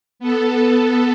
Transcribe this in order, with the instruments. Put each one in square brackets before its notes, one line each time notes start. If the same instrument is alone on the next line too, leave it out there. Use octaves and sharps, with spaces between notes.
[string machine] B3 A4